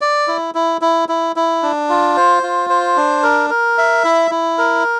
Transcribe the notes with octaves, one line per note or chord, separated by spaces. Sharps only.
D5
E4
E4
E4
E4
E4
D4
F4
C5
F4
C5
D4
A#4
A#4
E5
E4
E4
A#4